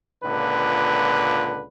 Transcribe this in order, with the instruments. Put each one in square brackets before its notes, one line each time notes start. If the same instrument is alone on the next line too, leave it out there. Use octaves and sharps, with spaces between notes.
[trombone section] C#2 A#2 D3 B4